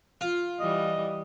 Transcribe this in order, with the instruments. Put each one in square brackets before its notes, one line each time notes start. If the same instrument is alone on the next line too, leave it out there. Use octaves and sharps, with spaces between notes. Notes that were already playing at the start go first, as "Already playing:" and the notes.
[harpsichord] F4
[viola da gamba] E3 G3 [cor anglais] D#5